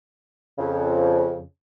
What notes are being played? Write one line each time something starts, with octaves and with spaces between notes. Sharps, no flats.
F2 C#3